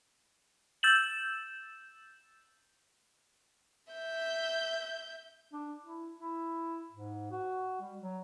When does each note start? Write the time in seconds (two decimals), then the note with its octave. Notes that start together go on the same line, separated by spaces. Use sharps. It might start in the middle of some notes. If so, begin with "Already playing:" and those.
0.83 E6 G6 A6 E7 F#7
3.92 E5 G6
5.53 D4
5.83 E4
6.19 E4
6.92 G#2
7.31 F#4
7.81 G3
7.99 F#3